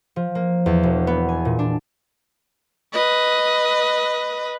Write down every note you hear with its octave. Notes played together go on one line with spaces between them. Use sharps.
F3
A#3
E2
E1
B3
G#5
A#2
D4
B4 D#5